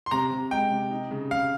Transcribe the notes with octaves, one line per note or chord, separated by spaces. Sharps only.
C6
C3 A#5
C3
G#3 G5
C3
D#4
C#3
C#3 F5